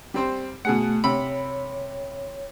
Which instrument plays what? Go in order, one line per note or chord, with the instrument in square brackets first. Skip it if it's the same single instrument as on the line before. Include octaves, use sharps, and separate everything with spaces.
[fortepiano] G3 C4 C5
[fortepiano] B2 G#4 F#5 [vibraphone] A3
[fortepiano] C3 B5 E6 [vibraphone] C#5